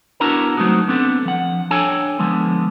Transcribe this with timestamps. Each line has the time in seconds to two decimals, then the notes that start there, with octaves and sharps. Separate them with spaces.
0.20 B3 D4 E4 F#4 A#4 A#5
0.57 F#3 A3 C4 D#4 F#4
0.88 B3 C4 D4 A4
1.25 F3 F#5
1.71 D4 A4 C#5 G5 G#5
2.19 D3 F3 G#3 B3